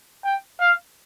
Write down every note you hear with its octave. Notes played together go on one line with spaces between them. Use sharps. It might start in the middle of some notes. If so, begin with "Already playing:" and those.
G5
F5